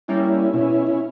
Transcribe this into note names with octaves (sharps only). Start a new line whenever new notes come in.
G3 A#3 C#4 E4
B2 C#4 E4
E4